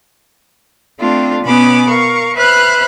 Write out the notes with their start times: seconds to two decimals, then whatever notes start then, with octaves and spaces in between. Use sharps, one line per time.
1.00 A3 C4 D4 F4
1.43 B2 B3 C#4 G#5 B5 D6
1.89 A#4 F5 C#6
2.36 B4 C5 E5 B5 F6 F#6